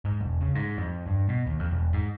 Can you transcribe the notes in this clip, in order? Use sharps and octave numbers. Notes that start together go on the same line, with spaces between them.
G#2
E1
C#3
G#2
F2
G2
B2
D#2
F2
E1
G#2